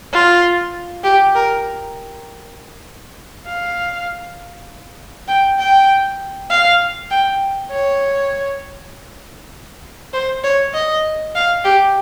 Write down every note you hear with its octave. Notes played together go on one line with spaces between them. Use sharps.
F4
G4
A#4
F5
G5
G5
F5
G5
C#5
C5
C#5
D#5
F5
G4